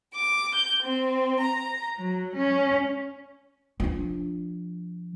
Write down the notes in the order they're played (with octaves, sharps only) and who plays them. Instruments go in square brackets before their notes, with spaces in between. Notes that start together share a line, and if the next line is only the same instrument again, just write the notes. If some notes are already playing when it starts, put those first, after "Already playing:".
[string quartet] D6
G6
C4
A#5
F#3
C#4
[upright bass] F3 D4